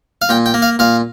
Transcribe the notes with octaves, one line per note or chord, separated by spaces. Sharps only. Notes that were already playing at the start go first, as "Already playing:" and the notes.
F5
A#2 G5
G5
A#3
F5
A#2 F5